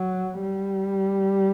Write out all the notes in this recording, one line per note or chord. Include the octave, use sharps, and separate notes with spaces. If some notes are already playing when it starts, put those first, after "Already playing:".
Already playing: F#3
G3